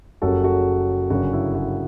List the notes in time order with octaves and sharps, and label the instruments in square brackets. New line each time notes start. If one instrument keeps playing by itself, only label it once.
[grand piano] F#1 F#2 C#3 G3 F#4 A4
F#4 A4
G1 F#2 C#3 F#3 F#4
E4
F#4